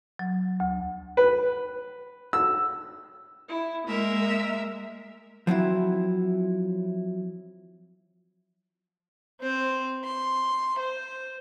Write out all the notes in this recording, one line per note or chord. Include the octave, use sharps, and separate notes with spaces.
F#3
D2
B4
E6
E4
G#3 A#3 A#4 E5
F3 F#3 C4 E4
C4 C5
C6
C5